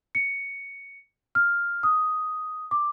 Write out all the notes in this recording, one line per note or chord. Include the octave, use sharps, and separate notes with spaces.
C#7
F6
D#6
D6